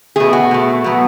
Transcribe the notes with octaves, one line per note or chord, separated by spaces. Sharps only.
B2 A3 G#4
F#4
B2 A3
B2 F#3 B3